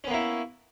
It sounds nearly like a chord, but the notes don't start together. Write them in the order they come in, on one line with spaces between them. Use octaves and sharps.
C#4 B3 A#3 E4